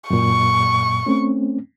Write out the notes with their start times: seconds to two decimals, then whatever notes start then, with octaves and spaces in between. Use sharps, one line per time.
0.10 F#2 A#2 C#6
1.06 A3 C4 C#4